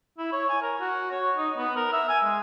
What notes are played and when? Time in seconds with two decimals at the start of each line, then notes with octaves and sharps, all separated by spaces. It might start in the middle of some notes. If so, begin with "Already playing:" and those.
0.18 E4
0.32 C#5
0.49 G#5
0.62 A#4
0.81 F#4
1.11 C#5
1.37 D#4
1.57 B3
1.76 A#4
1.93 E5
2.09 G#5
2.24 G#3